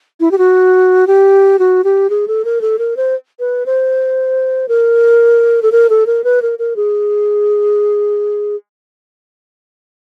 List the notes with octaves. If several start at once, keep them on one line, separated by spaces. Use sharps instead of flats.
E4
G4
F#4
G4
F#4
G4
G#4
A4
A#4
A4
A#4
C5
B4
C5
A#4
A4
A#4
A4
A#4
B4
A#4
A#4
G#4